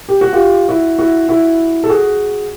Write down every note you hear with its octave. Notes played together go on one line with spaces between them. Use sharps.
G4
F#4
F4 G4
E4 F#4
E4 F#4
E4 F#4
A4
F#4 G#4